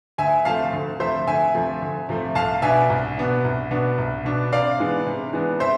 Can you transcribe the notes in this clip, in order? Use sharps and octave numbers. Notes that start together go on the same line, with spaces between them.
D2 E5 G#5
C3 F3 A3 F5 A5
D2
C3 F3 A3 C5 E5
D2 E5 G#5
C3 F3 A3
D2
C3 F3 A3
C2 F5 A5
B2 B3 D4 E5 G#5
C2
B2 B3 D4
C2
B2 B3 D4
C2
B2 B3 D4
C3 D5 F5
E3 G#3 B3 D4
C3
E3 G#3 B3 D4
C3 C5 E5